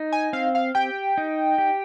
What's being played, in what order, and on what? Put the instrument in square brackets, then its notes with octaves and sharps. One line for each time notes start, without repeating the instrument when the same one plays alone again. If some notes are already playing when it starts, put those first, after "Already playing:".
Already playing: [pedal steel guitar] D#4
[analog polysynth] G#5
[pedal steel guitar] C4 [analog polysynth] F5
[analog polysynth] F5
[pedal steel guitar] G4 [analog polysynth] G5
[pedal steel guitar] D#4
G4